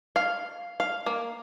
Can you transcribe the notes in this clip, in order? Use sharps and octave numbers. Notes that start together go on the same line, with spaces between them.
F5
F5
A#3